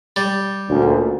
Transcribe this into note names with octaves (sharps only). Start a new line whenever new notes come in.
G3
D2 A#2 C#4